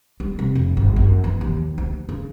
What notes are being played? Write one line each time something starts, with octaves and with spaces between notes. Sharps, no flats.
G3
C3
F1
G1
F#2
E3
D#2
D2
C#3